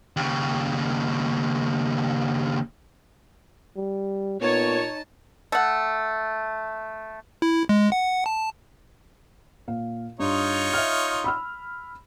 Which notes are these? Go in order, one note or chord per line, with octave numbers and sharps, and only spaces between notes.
D#2 C#3
G3
A#2 B3 D#4 C#5 A5
A3 F#5
E4
G#3
F#5
A5
A#2 F5
G2 D#4 F4 C#5
E5 F6
B5 E6 F6